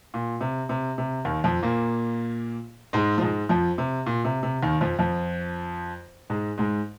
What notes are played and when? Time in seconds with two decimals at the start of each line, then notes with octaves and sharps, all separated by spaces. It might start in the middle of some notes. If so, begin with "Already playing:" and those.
0.14 A#2
0.41 C3
0.69 C3
0.98 C3
1.25 D#2 D#3
1.44 F2 F3
1.63 A#2 A#3
2.93 G#2 G#3
3.18 F3
3.21 G#2 G#3
3.49 F2 F3
3.78 C3
4.06 A#2
4.25 C3
4.43 C3
4.62 D#2 D#3
4.81 F2 F3
4.99 F2 F3
6.30 G#2 G#3
6.58 G#2 G#3